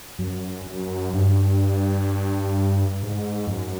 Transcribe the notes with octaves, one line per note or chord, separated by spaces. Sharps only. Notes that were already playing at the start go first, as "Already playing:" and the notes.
F#2
F#2
G2
G#2
F2
F#2